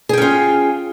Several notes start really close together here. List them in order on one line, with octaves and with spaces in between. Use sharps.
G#4 G5 C#4 F4